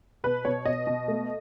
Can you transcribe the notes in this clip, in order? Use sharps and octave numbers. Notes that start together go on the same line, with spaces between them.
B2 B4
B2 C#5
B2 D#5
B2
A3